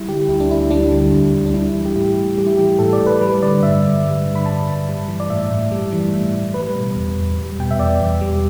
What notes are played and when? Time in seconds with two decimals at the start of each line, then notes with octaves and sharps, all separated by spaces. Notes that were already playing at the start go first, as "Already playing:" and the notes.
Already playing: G3 E4
0.08 D3 G4
0.29 D2 E4
0.40 D4
0.50 D2 E4
0.71 G3 D4
0.92 D3
1.12 D2
1.34 D2
1.46 D4
1.54 G3 E4
1.75 E3
1.86 G4
1.96 A2 E4
2.17 A2
2.38 G3 G4
2.47 E4
2.57 E3 G4
2.79 A2 A4
2.93 D5
3.00 A2
3.07 B4
3.22 G3 B4
3.42 D3 D5
3.63 G2 E5
3.83 G2
4.04 G3
4.26 D3
4.35 B5
4.46 G2 A5
4.67 G2
4.89 G3
5.08 E3
5.20 D5
5.30 A2 E5
5.51 A2
5.71 G3
5.93 E3
6.13 A2
6.33 A2
6.54 G3 B4
6.75 B2
6.96 E2
7.17 E2
7.38 G3
7.59 B2 G5
7.71 E5
7.79 E2 D5
8.01 E2
8.21 G3